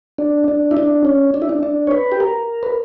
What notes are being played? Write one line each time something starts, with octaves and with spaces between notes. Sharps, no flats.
D4
D4
E4
D4
C#4
D4
E4
D4
D4
C#5
B4
G4
A#4
B4